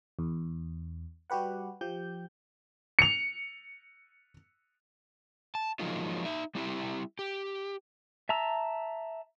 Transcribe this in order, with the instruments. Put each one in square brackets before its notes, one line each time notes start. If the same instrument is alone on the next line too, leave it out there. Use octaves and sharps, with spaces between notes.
[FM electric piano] E2
G3 F#4 G4 B4 F#5
F3 G4 G6
[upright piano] C#7 F7
[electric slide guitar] A5
F3 F#3 G#3 A#3 D#4 F4
D#4 E5
G3 C4 E4 G4
G4
[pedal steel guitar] E5 A5 A#5 E6